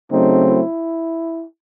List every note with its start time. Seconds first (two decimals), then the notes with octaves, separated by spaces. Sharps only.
0.11 C#3 F#3 A3 C4 D#4
0.47 E4